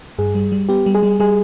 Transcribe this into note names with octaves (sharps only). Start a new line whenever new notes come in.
G2 G#4
G3
G3
B3 G4
G3
G#4
G3
G3 G#4